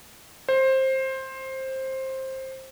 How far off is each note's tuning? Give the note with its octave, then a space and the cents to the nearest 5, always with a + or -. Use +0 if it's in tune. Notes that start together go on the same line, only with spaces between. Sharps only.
C5 +15